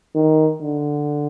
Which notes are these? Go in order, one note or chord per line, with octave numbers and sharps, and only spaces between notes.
D#3
D3